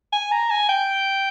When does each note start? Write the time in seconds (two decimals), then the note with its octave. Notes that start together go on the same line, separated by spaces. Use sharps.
0.13 G#5
0.32 A#5
0.51 G#5
0.69 G5